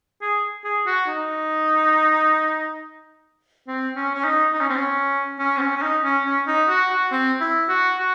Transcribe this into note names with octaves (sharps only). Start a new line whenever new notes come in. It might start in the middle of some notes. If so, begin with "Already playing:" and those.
G#4
G#4
F#4
D#4
C4
C#4
C#4
D#4
D#4
C#4
C4
C#4
C#4
C4
C#4
C#4
D#4
C#4
C#4
D#4
F#4
F#4
C4
E4
F#4
F#4